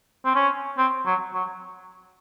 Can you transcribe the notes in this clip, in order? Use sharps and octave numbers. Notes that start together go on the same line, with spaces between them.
C4
C#4
C4
F#3
F#3